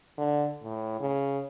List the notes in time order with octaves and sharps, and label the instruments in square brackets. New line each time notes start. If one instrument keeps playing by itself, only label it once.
[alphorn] D3
A2
C#3